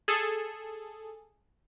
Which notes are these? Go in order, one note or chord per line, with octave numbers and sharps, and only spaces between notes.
G#4 A4